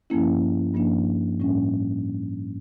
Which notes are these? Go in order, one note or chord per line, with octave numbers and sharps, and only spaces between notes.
G2 F3 A#3 C#4 E4
G2 F3 A#3 D4
A2 G3 C#4